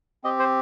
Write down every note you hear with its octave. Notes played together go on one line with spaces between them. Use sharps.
C4 G4 D#5
C5